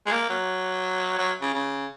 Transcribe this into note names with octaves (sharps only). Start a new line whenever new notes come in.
G#3
A#3
F#3
F#3
C#3
C#3